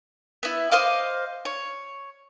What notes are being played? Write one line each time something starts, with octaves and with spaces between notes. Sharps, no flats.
B3 E4
C5 D#5 F5 D6
C#5